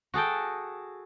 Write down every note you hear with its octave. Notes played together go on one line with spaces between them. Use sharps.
F#4 G#4 A4 G5